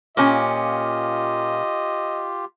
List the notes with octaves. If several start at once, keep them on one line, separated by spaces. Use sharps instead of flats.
A#2 C#4 F4 G4 D#5